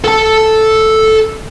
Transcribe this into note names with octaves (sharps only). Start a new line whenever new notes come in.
A4 A5